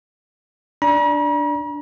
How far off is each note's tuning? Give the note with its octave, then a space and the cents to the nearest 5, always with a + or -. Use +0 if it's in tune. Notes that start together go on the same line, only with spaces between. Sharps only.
D4 +0 A#5 +45